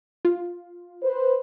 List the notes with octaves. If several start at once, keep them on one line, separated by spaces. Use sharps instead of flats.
F4
B4 C5